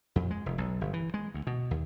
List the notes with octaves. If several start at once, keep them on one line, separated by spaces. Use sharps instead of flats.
F2
G#3
F1
B1
G1
E3
G#3
D2
B2
D#2